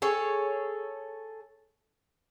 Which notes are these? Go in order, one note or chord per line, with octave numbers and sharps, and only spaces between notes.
G#4 A4 C#5